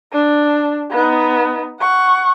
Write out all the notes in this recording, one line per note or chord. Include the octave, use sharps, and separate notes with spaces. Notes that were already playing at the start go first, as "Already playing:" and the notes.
D4
B3 D#4
F#5 C#6